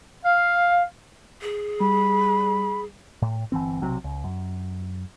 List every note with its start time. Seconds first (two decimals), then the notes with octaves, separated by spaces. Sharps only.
0.24 F5
1.41 G#4
1.80 G3 B5
3.22 A2
3.52 G1 E3 C4
3.81 B1 C3 F#3 C4
4.04 C#2
4.24 F#2